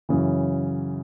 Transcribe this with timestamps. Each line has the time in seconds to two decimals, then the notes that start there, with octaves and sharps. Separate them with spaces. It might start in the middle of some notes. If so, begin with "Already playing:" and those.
0.09 F#2 C#3 E3